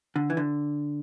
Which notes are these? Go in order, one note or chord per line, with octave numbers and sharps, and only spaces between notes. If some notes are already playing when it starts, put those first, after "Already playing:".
D3
E3
D3